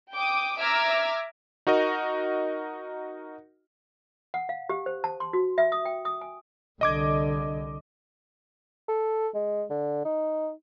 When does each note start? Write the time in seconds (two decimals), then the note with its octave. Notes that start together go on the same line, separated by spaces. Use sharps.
0.13 G5 D6 D#6
0.60 E5 A#5 D6 E6 F6 G#6
1.67 D#4 F#4 A#4 D#5
4.34 F#5
4.49 F5
4.69 G4
4.86 C5
5.04 A5
5.20 C6
5.33 F#4
5.58 E5
5.72 D#6
5.85 G5
6.05 D#6
6.21 G#5
6.81 C2 D3 D#5 D6 G#6
8.88 A4
9.34 G#3
9.70 D3
10.05 D#4